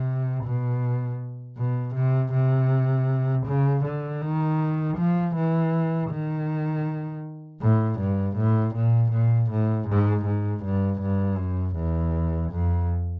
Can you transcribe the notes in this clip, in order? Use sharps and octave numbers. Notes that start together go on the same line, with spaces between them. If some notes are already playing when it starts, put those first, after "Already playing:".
Already playing: C3
B2
B2
C3
C3
C#3
D3
D#3
F3
E3
D#3
A2
G2
A2
A#2
A#2
A2
G#2
G#2
G2
G2
F#2
E2
F2